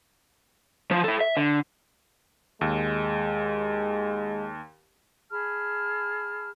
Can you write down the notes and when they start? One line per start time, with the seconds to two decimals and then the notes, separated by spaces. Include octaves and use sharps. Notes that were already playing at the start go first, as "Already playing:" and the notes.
0.91 F3 C5
1.04 E4 A4
1.21 E5
1.37 D3
2.61 D#2 G#3
5.31 G#4 A5 B5 F6